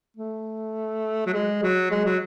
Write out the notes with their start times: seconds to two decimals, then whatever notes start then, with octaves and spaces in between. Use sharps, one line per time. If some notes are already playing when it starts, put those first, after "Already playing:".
0.17 A3
1.26 F#3
1.34 G#3
1.62 F#3
1.91 G#3
2.05 F#3